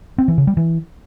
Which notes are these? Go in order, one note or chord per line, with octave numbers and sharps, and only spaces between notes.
C4
E3
C#3
G3
E3